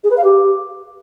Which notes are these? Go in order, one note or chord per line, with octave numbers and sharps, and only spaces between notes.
G#4
B4
F5
G4